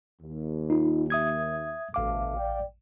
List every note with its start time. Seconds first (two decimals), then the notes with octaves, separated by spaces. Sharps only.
0.22 D#2
0.70 D#4 F4
1.10 E5 D#6 G#6
1.94 A1 D2 B2 A3 F5 D6
2.37 D5 G5